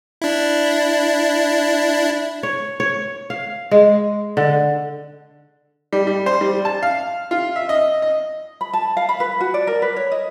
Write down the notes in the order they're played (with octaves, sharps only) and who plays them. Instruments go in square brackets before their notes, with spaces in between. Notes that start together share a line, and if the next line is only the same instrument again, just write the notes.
[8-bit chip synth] D4 E4
[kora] C#5
C#5
F5
G#3
D3
[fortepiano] G3
G3
C5
G3
A5
F5
F4
E5
D#5
D#5
[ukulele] B5
A5
F5
B5
B4
F#4
D5
A#4
B4
C#5
D#5